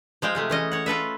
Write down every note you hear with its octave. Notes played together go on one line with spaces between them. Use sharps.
F3 G#3 F5 G5
C3 G#3 A3
E3 C#4 D#5
C#5 F#5
F4 A4 B4 E5